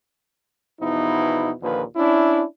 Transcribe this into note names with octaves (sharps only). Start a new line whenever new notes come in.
E2 B2 F3 D#4 E4
D#2 A#2 D3 F3 B4
C#4 D4 E4